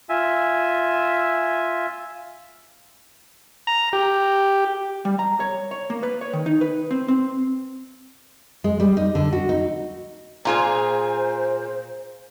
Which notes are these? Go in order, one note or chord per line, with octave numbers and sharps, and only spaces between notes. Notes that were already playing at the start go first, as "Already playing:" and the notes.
F4 E5 G#5
A#5
G4
G3
A#5
C#5
C#5
A#3
B4
C#5
D#3
D#4
B4
C4
C4
G#3
G3
D#4
D3
F#4
D#4
A#2 F4 G#4 C5